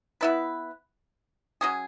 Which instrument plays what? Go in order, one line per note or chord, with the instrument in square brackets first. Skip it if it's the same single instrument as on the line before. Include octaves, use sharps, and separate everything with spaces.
[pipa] B3 E4 B4
F#3 C#4 G#4